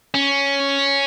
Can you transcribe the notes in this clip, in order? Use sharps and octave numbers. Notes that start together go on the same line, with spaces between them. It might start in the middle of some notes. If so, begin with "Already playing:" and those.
C#4